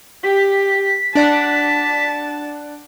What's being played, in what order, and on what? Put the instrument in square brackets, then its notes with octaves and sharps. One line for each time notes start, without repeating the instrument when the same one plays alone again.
[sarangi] G4 [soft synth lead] B6
[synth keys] D4 D5 F#5 [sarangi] A5